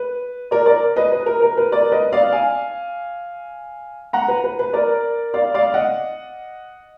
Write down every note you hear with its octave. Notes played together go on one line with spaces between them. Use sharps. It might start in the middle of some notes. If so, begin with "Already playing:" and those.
Already playing: B4
A#4 D5
A#4 D5
B4 D#5
B4
A#4
A#4
B4
A#4 D5
B4 D#5
D5 F5
F5 G#5
F#5 A#5
B4
B4
B4
A#4 D5
D5 F5
D5 F5
D#5 F#5